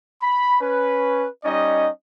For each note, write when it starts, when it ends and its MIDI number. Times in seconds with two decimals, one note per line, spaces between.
0.22 0.60 83
0.61 1.27 61
0.61 1.27 71
1.44 1.89 55
1.44 1.89 61
1.44 1.89 63
1.44 1.89 75